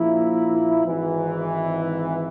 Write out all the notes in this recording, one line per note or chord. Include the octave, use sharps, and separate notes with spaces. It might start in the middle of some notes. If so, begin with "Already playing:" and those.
Already playing: A#1 A#2 F3 A#3 E4
G#1 G#2 E3